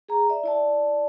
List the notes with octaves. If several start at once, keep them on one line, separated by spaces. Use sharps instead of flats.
G#4 A#5
D5 E5
E4 D5 A5